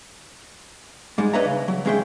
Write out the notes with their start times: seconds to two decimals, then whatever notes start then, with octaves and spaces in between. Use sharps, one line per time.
1.18 G#2 G3 G#3
1.33 D4 B4 C#5 D#5 E5 A#5
1.45 C#3
1.68 F#3
1.85 D#2 G#3 C#4 G#4 E5 G5